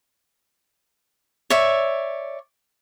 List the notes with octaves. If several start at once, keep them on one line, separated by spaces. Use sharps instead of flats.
C#5 D5 E5